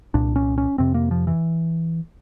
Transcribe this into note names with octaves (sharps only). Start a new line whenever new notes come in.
C2 A#2 D4
C#4
C#4
F2 C3 C4
A#3
F3
E3